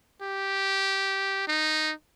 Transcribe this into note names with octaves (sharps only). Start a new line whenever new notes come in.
G4
D#4